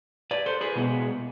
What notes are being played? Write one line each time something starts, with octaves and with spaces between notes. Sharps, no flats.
B4 D5
A4 C5
G#4 B4
B2 G#3 B3